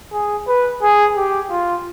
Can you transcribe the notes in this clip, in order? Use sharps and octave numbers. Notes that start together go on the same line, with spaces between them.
G#4
B4
G#4
G4
F4